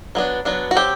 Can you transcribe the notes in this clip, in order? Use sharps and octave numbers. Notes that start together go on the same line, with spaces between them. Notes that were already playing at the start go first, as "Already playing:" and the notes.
F#3 B3 D4
F#3 B3 D4
F#4
F#3 C4 G4